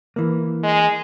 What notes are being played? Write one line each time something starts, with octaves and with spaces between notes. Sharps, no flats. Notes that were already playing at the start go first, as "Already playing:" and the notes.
E3 A#3
G#3